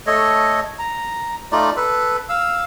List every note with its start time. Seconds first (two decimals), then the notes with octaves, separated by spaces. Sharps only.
0.07 A3 A4 C#5 D#5
0.79 A#5
1.52 A3 D#4 F4 D5
1.77 A4 B4
2.29 F5 E6